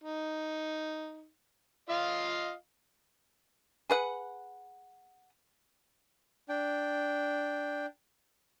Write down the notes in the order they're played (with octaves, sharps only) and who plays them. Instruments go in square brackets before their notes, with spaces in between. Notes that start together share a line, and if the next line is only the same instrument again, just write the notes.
[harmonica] D#4
F4 D#5 F5
[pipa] G#4 B4 F#5
[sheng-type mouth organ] D4 G5